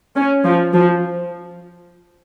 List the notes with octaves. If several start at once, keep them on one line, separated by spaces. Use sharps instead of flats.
C#4
F3
F3